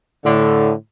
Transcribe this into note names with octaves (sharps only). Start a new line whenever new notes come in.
A2 D3